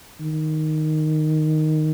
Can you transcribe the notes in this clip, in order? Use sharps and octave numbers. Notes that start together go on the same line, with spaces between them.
D#3